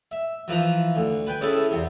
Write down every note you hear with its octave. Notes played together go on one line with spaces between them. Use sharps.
E5
E3 F3 B4 A#5
D2
B4 G5 G#5
C#4 E4 G#4 A4 B4
E2 C3